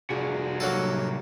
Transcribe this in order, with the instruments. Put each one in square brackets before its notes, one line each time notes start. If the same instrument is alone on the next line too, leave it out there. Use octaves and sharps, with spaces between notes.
[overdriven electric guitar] C2 F#4 [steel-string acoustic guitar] D4 F4 G#4
[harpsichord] F#3 A#3 A4